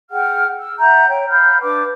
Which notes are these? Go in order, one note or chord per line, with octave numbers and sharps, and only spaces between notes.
G#4 F#5 G5 F6
E6
E5 F#5 A#5 G6
C#5 G5
F5 B5 F6 G6
D4 B4 D6